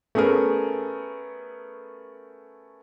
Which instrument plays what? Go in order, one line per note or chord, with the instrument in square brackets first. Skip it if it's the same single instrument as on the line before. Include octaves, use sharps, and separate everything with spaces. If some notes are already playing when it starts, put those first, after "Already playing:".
[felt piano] A3 B3 C#4 G#4 A#4